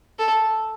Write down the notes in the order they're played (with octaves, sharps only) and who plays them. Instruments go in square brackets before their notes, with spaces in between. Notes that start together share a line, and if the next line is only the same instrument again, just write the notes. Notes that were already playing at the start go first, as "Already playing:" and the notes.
[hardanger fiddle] A4